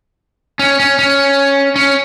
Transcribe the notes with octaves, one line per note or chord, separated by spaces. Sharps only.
C#4
C#4
C#4
C#4